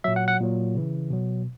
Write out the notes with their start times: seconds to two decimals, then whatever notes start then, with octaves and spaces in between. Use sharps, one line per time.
0.04 A#2 F#3 E5
0.16 F#5
0.28 F#5
0.40 A#2 F#3
0.75 C#3 E3
1.10 B2 F#3